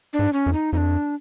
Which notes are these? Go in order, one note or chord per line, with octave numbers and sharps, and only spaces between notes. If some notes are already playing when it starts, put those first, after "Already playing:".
D4
G#2
C#4
F2
D#4
F2 D4 D#4